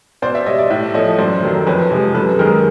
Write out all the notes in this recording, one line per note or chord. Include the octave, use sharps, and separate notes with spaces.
B2 C5 D5
D5 E5
G3 C#5 D#5
D5 E5
A2 D5 E5
F3 A3 C#5 D#5
F#2 C5 D5
D#3 F#3 A3
F2 B4 C#5
C3 F3 G#3
F#2 A4 B4
D#3 G#3 G#4 A#4